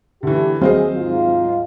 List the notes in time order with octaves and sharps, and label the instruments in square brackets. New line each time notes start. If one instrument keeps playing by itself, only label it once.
[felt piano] D3 E3 [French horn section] A3 G4
[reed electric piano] D#2 F#3 C4 [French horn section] G#4 [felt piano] C5 D#5 F5
[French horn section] G#2 F4